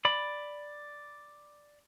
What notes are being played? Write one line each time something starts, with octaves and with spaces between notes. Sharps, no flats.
D5 B5